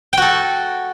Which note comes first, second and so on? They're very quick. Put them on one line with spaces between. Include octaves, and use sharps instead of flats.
G5 F#4 A4